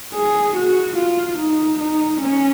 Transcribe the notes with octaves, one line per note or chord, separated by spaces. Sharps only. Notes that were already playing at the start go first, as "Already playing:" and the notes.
G#4
F#4
F4
D#4
D#4
C#4